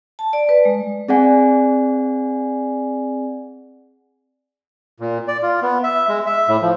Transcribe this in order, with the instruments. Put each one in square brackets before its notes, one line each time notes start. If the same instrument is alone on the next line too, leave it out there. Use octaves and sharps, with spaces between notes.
[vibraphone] A5
D5
B4
G#3
[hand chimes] C4 G#4 D5 F#5 G#5
[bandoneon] A#2
D5
F4
B3
E5
G#3
E5
A2
F3